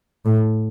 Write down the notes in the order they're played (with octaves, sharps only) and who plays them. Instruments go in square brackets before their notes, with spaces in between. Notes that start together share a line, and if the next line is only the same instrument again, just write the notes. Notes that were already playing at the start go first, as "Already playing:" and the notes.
[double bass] A2